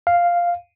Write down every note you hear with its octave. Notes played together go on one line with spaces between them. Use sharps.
F5